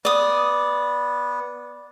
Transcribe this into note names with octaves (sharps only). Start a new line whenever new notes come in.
B3 D5 D#6